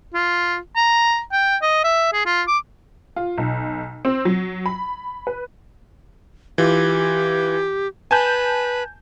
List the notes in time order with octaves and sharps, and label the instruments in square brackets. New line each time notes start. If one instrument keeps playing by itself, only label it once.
[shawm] F4
A#5
G5
D#5
E5
G#4
F4
D6
[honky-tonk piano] F4
B1
C4
F#3
B5
B4
[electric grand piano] E3 F4 [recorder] G4
[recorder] B4 [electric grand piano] G#5 A5 G6